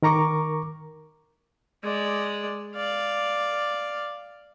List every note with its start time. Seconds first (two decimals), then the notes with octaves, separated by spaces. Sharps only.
0.03 D#3 A#4 A#5 C#6 D6
1.83 G#3 D5
2.76 D5 F5